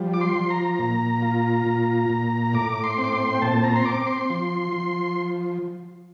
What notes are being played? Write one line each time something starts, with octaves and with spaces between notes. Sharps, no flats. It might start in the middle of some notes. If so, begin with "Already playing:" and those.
Already playing: F3 G3
D6
C6
F3
A#5
A#2
F4
A#2
A#2
A2 D6
C6
C4
D6
C6
G5
A#2 A5
A#5
C6
C4 D6
C6
F3
F3